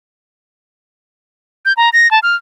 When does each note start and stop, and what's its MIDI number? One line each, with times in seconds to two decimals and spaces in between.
1.65 1.73 91
1.77 1.90 82
1.93 2.10 94
2.11 2.19 81
2.23 2.36 89